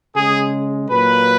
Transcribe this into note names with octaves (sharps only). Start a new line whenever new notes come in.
C#3 G#3 G#4
A#2 F#3 A#3 B4